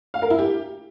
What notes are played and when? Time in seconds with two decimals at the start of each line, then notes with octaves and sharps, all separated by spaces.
0.14 F5
0.22 A#4
0.30 E4
0.39 G4